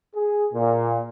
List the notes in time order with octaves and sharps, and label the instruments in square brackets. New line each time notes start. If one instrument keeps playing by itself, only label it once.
[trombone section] G#4
A#2